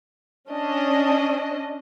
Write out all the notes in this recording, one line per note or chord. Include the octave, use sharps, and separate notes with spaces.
C#4 D4 D#5